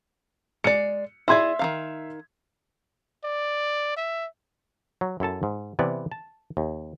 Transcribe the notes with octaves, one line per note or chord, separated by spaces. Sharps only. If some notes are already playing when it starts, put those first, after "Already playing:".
G#3 D5 C#7
E4 G#4 D5 E5 C6 G#6
D#3 F3 F5
D5
E5
F#3
F#2 E4 A4 A5
G#2
C3 E3 B3 D5
A5
D#2